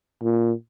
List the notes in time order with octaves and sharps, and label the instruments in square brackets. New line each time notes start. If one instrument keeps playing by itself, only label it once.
[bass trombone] A#2